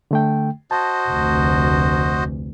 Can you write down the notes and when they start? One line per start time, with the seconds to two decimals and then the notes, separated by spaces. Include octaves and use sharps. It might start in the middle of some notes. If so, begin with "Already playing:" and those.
0.11 D3 A3 G5
0.71 F#4 C5 D#5 A5
1.09 F1 D2